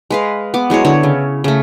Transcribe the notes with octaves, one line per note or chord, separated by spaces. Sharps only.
G#3 B4 F5
B3 D6
F#3 G#3 E4 C#5
D3 E4 C#5
C#3
C#3 A3